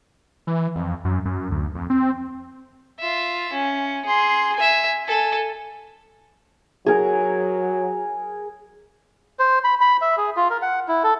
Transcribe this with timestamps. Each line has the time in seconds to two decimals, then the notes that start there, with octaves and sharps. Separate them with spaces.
0.47 E3
0.75 F2
1.05 F#2
1.25 F#2
1.51 D2
1.75 F2
1.90 C4
2.99 F4 E5
3.53 C#4
4.05 G#4 C6
4.56 E5 G#5
5.05 A4 G#5
6.86 F#3 G#4 A#4
9.39 C5
9.64 B5
9.81 B5
10.01 E5
10.17 G#4
10.37 F4
10.50 A#4
10.62 F#5
10.88 E4
11.04 A4